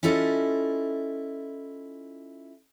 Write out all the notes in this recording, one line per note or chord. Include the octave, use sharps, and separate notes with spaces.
C#4 E4 F4 A4 A#4 D#5